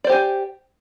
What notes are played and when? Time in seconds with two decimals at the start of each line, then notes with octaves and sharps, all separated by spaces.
0.04 D5
0.07 C5
0.09 G4
0.12 G#5